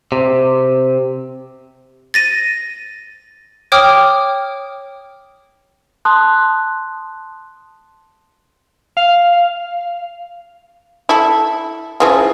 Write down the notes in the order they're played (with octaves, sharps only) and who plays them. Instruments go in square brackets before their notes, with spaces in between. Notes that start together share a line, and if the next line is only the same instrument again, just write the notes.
[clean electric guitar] C3
[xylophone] A6 A#6 D#7
C#5 G5 D6 D#6 F6
[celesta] A5 C6 D#6 F#6
[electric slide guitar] F5
[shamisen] E4 A4
C#3 E3 F3